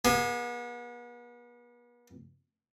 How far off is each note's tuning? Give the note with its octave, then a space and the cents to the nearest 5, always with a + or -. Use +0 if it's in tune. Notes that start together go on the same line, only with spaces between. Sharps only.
B3 -40 G#4 +0